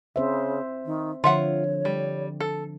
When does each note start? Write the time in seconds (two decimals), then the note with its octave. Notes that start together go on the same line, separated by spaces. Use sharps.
0.16 C#3 C4 C5 E5
0.85 D#3
1.24 D3 F3 F4 C#5 E5 F#5
1.85 G3
2.40 A4